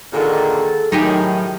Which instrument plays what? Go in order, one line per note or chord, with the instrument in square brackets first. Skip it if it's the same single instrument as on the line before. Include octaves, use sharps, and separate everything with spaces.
[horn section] A#2 D3 D#3 [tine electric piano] G#4 [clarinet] A4
[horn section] A2 D#3 [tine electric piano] F#3 [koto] D#4 G4 G#4